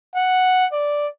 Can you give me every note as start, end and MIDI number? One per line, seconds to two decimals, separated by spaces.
0.15 0.65 78
0.72 1.07 74